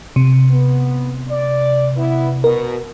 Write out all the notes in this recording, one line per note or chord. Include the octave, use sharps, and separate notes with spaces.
C3
B3
D5
B3 E4 B4
B2 A#4